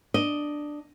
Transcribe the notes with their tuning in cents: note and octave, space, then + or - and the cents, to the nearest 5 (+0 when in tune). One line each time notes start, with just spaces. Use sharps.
D4 +10 D#5 +5